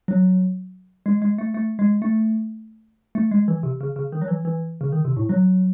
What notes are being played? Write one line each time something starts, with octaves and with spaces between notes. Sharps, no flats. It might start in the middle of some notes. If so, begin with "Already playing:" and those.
F#3
G#3
G#3
A3
A3
G#3
A3
A3
G#3
E3
C3
C#3
C#3
D#3
F#3
E3
E3
C#3
D#3
C3
A2
F#3